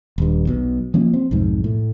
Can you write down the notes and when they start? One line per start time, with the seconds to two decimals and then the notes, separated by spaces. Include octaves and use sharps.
0.18 D#1 G2
0.47 B1 B2
0.94 F3 A#3 C#4
1.14 C4
1.31 B1 F2 G#2
1.64 A2